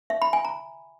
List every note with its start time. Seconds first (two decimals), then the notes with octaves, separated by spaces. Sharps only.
0.10 E5
0.22 B5
0.33 G#5
0.45 A#5